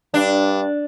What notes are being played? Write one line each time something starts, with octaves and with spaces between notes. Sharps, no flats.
G2 D4